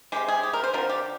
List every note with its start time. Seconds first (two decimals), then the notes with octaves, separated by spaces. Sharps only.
0.12 C3 D#3 G#3 G4
0.28 G#4
0.43 G4
0.53 A#4
0.64 C5
0.74 D3 F3 C4 A#4
0.89 G4